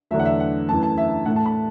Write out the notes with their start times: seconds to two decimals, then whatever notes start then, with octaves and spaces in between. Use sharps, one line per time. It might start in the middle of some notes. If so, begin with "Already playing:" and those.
0.11 E2 D3 F#3 A3 E5
0.19 F#5
0.25 E5
0.40 F#5
0.68 F#2 E3 A3 A5
0.83 A5
0.98 E5
1.26 A2 A3 F#5
1.36 A5
1.46 B5